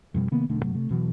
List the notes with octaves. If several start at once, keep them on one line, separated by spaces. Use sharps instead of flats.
F2 B2 G3
C3 D#3 A#3 B3
E1 B1 D3 A3
G2 C3 F#3 A3
C3 A3
E1 B2 E3 F#3